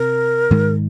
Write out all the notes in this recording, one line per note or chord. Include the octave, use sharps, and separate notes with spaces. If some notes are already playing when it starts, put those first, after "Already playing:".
Already playing: C3 C4 A#4
G#2 D#3 G#3